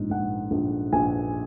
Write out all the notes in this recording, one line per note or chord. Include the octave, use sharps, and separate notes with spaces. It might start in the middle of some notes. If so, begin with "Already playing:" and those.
Already playing: A#1 G#2
A#1 F#5
A#1
A#1 G#5